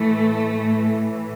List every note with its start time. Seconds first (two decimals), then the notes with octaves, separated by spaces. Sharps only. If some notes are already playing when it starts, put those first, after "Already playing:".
Already playing: A2 E3 A3
0.55 A2 E3